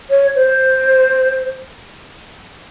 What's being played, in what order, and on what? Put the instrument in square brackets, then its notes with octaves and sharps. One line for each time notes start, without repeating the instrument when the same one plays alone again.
[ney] C#5
C5